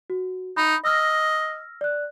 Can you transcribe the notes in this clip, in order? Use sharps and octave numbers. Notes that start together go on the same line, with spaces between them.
F#4
D#4 B5
D#5 E6 F6 A#6
D5 F#6